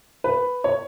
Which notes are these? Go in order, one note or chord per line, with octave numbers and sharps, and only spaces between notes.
B4
C#5